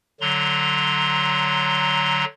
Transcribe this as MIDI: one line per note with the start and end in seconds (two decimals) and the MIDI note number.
0.21 2.25 50
0.21 2.25 54
0.21 2.25 82
0.21 2.25 84